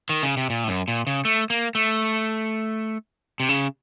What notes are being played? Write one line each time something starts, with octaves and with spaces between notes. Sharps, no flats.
D#3
C#3
C3
A#2
A2
F#2
A#2
C#3
A3
A#3
A3
C3
C#3